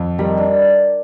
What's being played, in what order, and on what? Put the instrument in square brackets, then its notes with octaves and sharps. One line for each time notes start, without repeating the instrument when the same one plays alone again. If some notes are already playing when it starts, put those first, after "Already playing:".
Already playing: [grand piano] F2
[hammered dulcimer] D#3 [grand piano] G3
[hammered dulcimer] D4